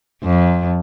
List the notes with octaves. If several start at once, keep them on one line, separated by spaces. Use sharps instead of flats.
F2